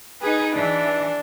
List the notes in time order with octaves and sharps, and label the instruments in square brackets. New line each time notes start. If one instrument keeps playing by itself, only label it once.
[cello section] D#4 B4 [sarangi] G#4
[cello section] E3 [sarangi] D4